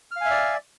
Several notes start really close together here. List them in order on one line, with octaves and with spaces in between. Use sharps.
F6 F5 G#5 E5 D5